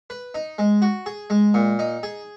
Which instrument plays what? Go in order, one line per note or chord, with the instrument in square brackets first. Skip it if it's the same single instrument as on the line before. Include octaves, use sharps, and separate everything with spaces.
[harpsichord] B4
D#4
G#3
F#4
G#4
G#3
A#2
D#4
G#4